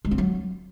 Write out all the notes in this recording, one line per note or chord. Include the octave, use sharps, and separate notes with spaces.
G#3
C4
F#3